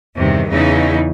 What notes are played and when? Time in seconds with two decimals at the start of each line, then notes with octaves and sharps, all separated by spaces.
0.16 E2 G2 C3 D#3
0.49 E2 C#3 D#4 E4